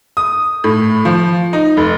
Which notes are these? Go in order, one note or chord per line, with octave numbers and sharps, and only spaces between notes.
D#6
A2
F3
D#4
F1